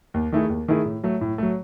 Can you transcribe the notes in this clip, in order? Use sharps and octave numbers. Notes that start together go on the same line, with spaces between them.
D#2
D#3 A3 E4 G#4
D#2
D#3 A3 E4 G#4
A2
F#3 A3
A2
F#3 A3